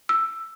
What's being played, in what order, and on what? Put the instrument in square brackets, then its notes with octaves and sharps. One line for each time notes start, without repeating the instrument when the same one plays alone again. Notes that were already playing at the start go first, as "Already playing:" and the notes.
[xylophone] E6